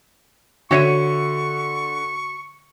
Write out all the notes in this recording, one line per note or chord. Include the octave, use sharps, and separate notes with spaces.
D3 F#4 C#5 E5 C#6 C#7 D#7